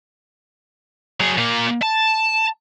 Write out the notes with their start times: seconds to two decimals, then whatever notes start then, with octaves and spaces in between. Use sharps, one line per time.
1.20 F#3 G#4
1.37 A#2 A#3
1.83 A5